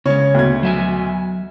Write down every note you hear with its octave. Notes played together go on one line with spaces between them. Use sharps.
C#3 G#3 C#4 C#5
D2 B2 G#6
F#3 E5 G#5